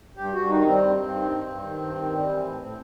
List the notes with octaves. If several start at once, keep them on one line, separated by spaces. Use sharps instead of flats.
G2 G4
G2 F#4
D#3 D#4
D#4
G3 C4
G2
G2
D#3
G2
G2
D#3
G2
D#3
G3
E3
A2
A2 C4